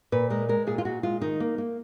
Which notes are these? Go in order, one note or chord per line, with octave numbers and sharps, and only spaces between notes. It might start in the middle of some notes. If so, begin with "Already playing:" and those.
A#2 B4
G#3 A#4
G#3 A#4
A#2 G#4
F4
A#2 F#4
G#3 F4
D#3 D#4
A#3
A#3